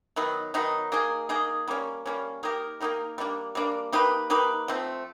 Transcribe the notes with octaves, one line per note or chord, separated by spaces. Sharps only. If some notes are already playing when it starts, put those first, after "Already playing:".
D#3 F#3 B3 D#4
D#3 F#3 B3 D#4
A#3 D#4 G#4
A#3 D#4 G#4
G3 A#3 C#4
G3 A#3 C#4
A#3 D#4 G4 A#4
A#3 D#4 G4 A#4
G3 A#3 D4
G3 A#3 D4
A#3 D#4 G4 B4
A#3 D#4 G4 B4
F3 A3 C4